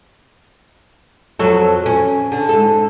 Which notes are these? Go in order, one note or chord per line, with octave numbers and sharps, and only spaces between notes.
F2 F#3 A4
C#4
D3
G#2 A4